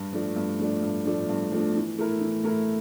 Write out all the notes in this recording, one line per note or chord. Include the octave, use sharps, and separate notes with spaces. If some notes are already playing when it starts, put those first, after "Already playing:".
Already playing: G2
F3 A3 D4
G2
F3 A3 D4
G2
F3 A3 D4
G2
F3 A3 D4
E3
A3 E4 A#4
E3
A3 E4 A#4